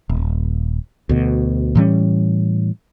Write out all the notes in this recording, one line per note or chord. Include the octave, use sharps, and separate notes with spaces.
D#1
D2 B2
A2 E3 G3 C#4